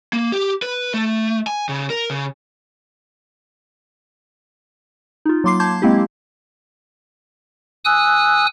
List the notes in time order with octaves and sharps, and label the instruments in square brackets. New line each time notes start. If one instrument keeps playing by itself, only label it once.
[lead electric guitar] A#3
G4
B4
A3
G#5
C#3
A#4
C#3
[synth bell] D#4 F4
F#3 A#3 C6 D6 C7
A5 C6 D6 G6 G#6
G#3 A#3 C4 E4 G4
[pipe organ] G#5 D#6 E6 F#6